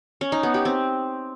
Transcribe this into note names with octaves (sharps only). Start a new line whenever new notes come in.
C#4
D#4
B3
G4
C4